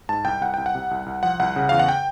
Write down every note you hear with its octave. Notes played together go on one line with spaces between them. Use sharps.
G#2 A5
C2 G5
C2 F#5
C2 G5
F#5
C3
C2
C2
F3 F#5
C2 F#5
C#3
E2 F5
F#5
G5